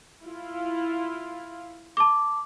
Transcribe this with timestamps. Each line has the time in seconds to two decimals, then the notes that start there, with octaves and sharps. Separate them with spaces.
0.24 E4 F4
1.97 A5 D6